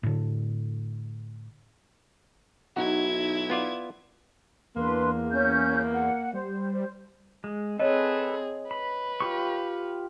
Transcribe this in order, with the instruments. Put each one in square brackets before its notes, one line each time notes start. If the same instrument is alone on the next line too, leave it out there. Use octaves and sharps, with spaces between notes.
[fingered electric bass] A2 D3
[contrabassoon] B1 [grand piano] D#4 F#4 [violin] E4 G#6
[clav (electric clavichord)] B3 F4 D5
[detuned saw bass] E2 [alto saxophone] A#3 [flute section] D4 B4 C6
[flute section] C#4 G6
F#5
[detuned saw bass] G3 [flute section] C5
[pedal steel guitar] G#3
[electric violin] C4 G#4 [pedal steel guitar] A4 B4 [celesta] C#5 D#5
[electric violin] B4 [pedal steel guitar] B5
[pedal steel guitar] F4 G4 C#6